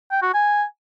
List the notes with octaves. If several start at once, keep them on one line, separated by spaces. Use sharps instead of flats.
G5
F#4
G#5